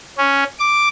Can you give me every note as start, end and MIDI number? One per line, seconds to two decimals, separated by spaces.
0.18 0.44 61
0.60 0.88 86